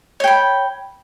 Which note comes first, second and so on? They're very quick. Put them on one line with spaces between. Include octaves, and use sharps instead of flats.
C#5 G5 B5